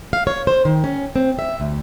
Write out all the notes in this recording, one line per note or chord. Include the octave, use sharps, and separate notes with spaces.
F5
C#5
C5
D#3
C#4
C4
E5
D2